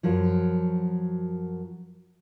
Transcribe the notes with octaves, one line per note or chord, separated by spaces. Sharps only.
F#2 F3 F#3